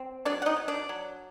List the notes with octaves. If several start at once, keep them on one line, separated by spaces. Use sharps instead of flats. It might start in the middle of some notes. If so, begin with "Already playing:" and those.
Already playing: C4
F#3 D4 D5
F#5
D#4 D#5
F#3
D4 D5
F#3